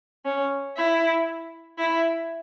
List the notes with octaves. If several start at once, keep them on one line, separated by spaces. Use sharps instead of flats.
C#4
E4
E4